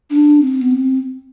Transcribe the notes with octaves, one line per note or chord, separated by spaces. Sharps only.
D4
C4
B3
C4